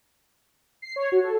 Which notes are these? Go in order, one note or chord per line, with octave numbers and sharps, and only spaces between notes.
C7
C#5
F#4
A4